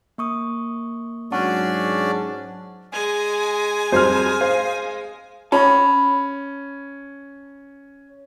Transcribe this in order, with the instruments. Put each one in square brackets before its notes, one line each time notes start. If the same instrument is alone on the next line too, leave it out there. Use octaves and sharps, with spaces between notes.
[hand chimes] A#3 C#6 D#6
[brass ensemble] G#2 F#3 [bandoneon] C#4 D4 D5 [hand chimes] F#5 A5 C#6
[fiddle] G#3 [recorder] G#5
[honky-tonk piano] F2 F#3 G3 [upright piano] C5 F6
[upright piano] C5 [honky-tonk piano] F5
[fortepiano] C#4 [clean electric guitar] A5 B5